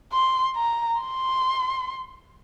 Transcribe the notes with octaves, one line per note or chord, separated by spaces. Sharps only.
C6
A#5
C6